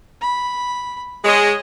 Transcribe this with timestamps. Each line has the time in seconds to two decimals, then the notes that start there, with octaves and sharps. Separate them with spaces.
0.21 B5
1.24 G#3 C#5 D#5